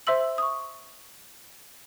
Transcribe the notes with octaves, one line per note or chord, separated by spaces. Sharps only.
C5 E5 C6 E6 F#7
C#6 D#6